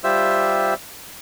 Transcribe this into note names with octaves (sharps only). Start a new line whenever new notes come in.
G3 F4 G4 C5 E5 E6